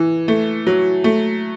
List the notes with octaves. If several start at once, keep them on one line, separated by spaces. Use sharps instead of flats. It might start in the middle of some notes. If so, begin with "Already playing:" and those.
Already playing: E3
A3
F#3
A3